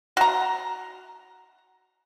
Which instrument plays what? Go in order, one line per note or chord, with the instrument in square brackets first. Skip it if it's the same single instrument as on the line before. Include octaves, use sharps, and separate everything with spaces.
[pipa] F#4 A#5